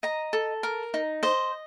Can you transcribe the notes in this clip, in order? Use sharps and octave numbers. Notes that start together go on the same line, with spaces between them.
D#5 A#5
A4
A#4
D#4
C5 D#5